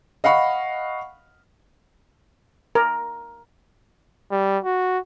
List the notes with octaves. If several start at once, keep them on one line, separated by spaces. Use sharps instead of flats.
D#5 F5 F#5 B5 C#6
A#4
G3
F#4